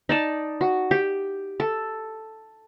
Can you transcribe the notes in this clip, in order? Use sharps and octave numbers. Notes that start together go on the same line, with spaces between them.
D#4 D5 A5
F#4
G4
A4